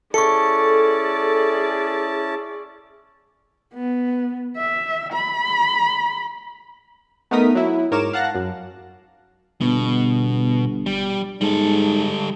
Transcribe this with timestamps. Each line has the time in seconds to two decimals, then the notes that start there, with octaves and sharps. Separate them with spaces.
0.14 C#4 E4 G#4 A4 D5 A5 C#6 C#7
3.74 B3
4.56 E5
5.13 B5
7.31 A3 B3 D#4 A#4 D#6 B6
7.55 F#3 E4
7.91 G#2 A#4 C#5 D6 E7
8.13 F5 F#5 A5 F#6 A#6
8.34 F#2
9.61 G1 B2
10.86 G3
11.41 G#2 G3 A4